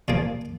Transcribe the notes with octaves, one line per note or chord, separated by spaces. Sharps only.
A#2 F3 A#3 G#4